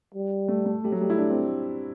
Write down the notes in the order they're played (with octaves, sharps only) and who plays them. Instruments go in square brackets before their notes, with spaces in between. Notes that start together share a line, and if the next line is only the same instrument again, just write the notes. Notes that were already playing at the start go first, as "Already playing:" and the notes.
[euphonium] G3
[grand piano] A3
A3
[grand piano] G3 [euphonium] A3
[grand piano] F#3
G3
E4
D4
C4